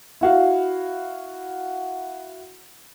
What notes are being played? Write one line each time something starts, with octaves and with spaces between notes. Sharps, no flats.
E4 F#4 F5